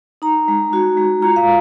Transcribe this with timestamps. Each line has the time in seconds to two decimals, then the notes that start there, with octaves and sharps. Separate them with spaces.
0.22 D#4 A#5
0.48 G#3
0.73 F#4
0.97 G#3
1.22 F4 A#5
1.36 F5